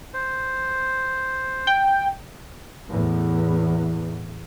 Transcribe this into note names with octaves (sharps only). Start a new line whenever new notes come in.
C5
G5
E2 A2